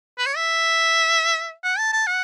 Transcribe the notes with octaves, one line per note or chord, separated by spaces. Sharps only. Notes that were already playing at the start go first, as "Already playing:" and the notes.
B4
C#5
E5
F#5
A5
A5
F#5